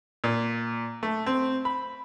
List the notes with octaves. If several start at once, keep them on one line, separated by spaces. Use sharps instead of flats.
A#2
A3
C4
B5